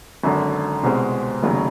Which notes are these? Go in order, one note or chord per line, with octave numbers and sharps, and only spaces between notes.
G#1 F#2 D3
C2 B2 G#3 C4
F1 D#2 C#3 F#3